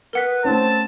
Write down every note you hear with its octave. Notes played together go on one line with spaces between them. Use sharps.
A#4 B4 F#5 B6
A3 C4 C#4 A5